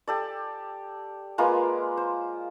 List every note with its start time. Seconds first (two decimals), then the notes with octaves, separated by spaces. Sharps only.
0.07 G4 A4 D5
1.38 G#3 A#3 F4 B4
1.97 C5